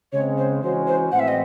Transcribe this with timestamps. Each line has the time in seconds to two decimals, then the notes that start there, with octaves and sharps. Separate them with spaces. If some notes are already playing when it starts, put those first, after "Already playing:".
0.12 C#3 G#3 C4 C#5
0.37 C5
0.62 E3 G#3 C#4 F#4 C5
0.87 C5
1.12 A2 E3 G#3 C4 F#5
1.19 E5
1.28 D#5